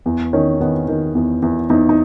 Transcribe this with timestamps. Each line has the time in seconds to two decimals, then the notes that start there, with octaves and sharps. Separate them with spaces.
0.06 E2
0.33 D#3 C#4
0.61 D#3 B3
0.88 D#3
1.15 E2
1.42 E2
1.70 E2 D#4
1.89 D#4